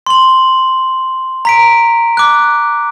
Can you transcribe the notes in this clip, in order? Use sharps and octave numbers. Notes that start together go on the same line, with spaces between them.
C6 F#7
A#5 B6 D7
D6 F#6